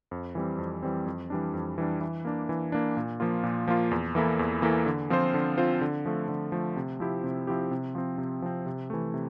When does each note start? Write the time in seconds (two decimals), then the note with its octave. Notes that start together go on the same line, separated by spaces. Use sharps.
0.11 F2
0.35 E3 G3 C4
0.58 F2
0.83 E3 G3 C4
1.06 F2
1.30 E3 G3 D4
1.54 F2
1.78 E3 G3 D4
2.01 E3
2.25 A#3 D4
2.49 E3
2.72 A#3 D4
2.97 A#2
3.20 F3 A#3 F4
3.43 A#2
3.67 F3 A#3 F4
3.91 E2
4.15 E3 A#3 E4 A4
4.39 E2
4.62 E3 A#3 E4 A4
4.86 D3
5.10 F3 C4 F4 C5
5.34 D3
5.58 F3 C4 F4 C5
5.81 D3
6.06 F3 A3
6.29 D3
6.52 F3 A3
6.76 C3
7.00 F3 C4 E4 G4
7.24 C3
7.47 F3 C4 E4 G4
7.71 C3
7.95 F3 C4
8.18 C3
8.42 F3 C4
8.66 C3
8.90 E3 A3
9.14 C3